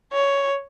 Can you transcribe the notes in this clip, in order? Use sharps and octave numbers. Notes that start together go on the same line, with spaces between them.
C#5